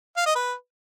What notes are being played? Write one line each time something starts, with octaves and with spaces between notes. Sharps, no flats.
F5
D#5
B4